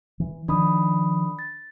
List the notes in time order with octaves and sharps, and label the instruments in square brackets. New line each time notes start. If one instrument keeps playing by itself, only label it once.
[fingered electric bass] E3
[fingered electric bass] D#3 F3 [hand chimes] D4 B5 D#6
[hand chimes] A6